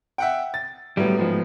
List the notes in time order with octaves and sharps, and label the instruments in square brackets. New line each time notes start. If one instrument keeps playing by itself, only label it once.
[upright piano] E5 F#5 G5
A6
[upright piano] A2 F#3 B3 [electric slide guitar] G3
[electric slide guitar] G#2 F3